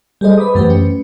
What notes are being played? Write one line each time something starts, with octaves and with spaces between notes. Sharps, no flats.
G3 G#4 A4 C5 D#5
B4 B5 D6 D#6
F#2 E3 A3 G4 B4 C5
C#4